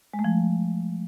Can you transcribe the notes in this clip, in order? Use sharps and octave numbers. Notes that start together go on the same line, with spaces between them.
G#3
A3
F3